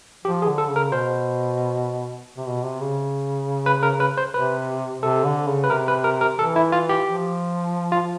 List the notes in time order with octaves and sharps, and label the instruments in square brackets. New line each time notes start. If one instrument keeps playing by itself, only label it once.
[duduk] F3 [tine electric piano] G4
[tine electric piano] G#4
[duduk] D3
[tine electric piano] A4
[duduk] C#3
[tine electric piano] A#4
[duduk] B2 [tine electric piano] C5
[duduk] C3
B2
C3
C#3
[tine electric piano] B4
A#4
B4
C5
[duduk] C3 [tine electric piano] B4
[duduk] C3 [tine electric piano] A4
[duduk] D3
C#3
[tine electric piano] B4
[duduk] C3 [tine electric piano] A#4
[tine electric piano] B4
A#4
A#4
[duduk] E3 [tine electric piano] A4
[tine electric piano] E4
F4
G4
[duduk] F3
[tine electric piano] F4